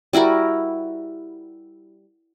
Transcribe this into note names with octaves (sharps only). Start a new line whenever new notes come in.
G3 E4 F#4 A#4